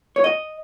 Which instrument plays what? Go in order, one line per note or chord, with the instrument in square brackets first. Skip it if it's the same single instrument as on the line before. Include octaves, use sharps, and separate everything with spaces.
[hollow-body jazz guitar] C#5
D#5